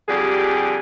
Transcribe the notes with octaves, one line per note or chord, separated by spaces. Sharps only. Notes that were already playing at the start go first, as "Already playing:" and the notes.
F2 D3 G3 G4 G#4